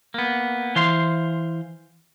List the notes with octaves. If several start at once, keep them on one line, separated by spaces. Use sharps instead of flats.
A#3 B3
E3 C5 F5 C6